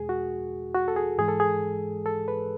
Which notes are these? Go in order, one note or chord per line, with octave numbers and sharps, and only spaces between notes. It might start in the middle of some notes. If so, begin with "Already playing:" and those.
Already playing: E2 B2 G#3 G#4
F#4
F#4
A4
G#4
G#2 E3 G#3 G#4
A4
G#4
A4
B4